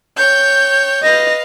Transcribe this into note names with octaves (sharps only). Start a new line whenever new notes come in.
C#5 G5 G6
B4 D#5 F5 A#6